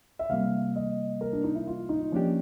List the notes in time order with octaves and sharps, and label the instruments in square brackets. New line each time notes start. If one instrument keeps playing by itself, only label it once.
[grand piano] E5
[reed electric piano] C3 E3 G3 A#3 [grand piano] F5
[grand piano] D#5
A#4
D4
D#4
E4
F4
D#4
[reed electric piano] F3 A#3 D4 G4 [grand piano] C#4